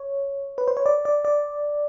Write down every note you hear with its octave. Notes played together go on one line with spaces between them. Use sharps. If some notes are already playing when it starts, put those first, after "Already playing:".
Already playing: C#5
B4
C5
C#5
D5
D5
D5